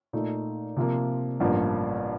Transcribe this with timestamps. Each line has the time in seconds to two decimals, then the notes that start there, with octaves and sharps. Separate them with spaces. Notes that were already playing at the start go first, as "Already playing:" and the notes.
0.13 A#2 A3 D#4
0.77 C3 F3 A#3
1.40 A1 G2 F3 A#3